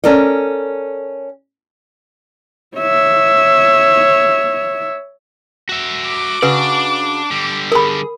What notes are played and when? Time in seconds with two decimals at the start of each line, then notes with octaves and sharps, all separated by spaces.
0.04 C#4 A4 A#4 D5 D#5
2.77 C#5 E5
5.69 F#4 E5
6.08 D6
6.42 C#3 D4 F#4 B4 D5
7.31 D3 G3
7.72 G#4 A#4 B5